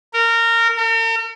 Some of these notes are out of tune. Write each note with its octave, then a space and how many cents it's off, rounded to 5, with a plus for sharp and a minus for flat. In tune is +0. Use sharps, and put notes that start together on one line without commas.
A#4 -20
A#4 -45